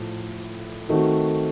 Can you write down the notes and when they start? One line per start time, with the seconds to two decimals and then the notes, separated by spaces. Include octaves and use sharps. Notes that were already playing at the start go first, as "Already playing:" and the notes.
Already playing: A2 F3 A3
0.89 D#3 A3 C4 F#4